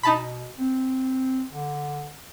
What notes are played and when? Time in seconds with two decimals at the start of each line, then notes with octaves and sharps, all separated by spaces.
0.03 B2 D#4 A5 B5
0.58 C4
1.52 D3